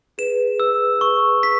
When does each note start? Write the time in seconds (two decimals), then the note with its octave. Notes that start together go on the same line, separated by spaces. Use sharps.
0.18 G#4 B4 E7
0.60 E6
1.01 C#6
1.43 B6